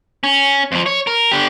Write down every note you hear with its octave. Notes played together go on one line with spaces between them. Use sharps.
C#4
F2 F3
C#5
A#4
D3 G4